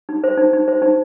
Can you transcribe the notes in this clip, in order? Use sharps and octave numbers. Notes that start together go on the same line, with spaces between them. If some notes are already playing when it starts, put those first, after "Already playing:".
D#4
C5
D#4
D#4
C5
D#4